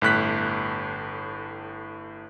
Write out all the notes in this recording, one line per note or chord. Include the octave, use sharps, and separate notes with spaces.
G1 A2 F#6 B6